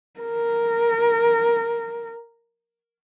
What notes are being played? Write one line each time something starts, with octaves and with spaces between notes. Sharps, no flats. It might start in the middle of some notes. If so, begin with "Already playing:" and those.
A#4